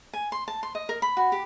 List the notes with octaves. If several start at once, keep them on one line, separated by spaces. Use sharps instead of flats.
G#5
C6
A5
C6
D#5
A#4
B5
F#4
G4